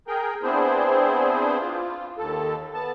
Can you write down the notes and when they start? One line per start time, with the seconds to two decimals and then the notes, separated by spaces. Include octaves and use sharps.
0.08 G#4 A#4 G5
0.43 B3 C4 D4 E4 G#4 C5
1.60 F4
2.18 D#2 A4
2.74 B3 A5